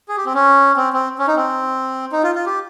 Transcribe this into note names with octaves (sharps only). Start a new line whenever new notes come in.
G#4
G4
C4
C#4
C4
C4
C#4
D#4
C4
D#4
F4
F4
G4